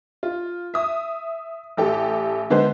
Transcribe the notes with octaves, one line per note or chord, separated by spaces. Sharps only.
F4
E5 D#6
A1 G4 A4
D3 G#3 B3 C5